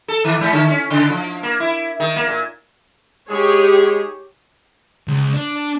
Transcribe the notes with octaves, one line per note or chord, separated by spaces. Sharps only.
A4
D#3
G#2
D3
C#4
C#3
F3
A#3
E4
D#3
A#3
A#2
G#3 D#4 G4 G#4 C#5
C#2
D4